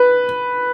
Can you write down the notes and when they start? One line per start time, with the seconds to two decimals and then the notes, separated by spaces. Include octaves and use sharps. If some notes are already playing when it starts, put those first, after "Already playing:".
Already playing: B4